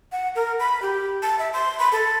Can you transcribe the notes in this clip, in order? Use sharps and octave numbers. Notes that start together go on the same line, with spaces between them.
F#5
A#4
B5
G4
A5
E5
C6
B5
A4